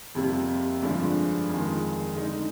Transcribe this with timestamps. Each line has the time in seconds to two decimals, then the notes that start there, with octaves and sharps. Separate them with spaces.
0.15 F2 C3 G3 A#3
0.82 G2 D3 F3 G#3 D4
1.49 F2 D#3 G#3
2.16 D3 G#3 D#4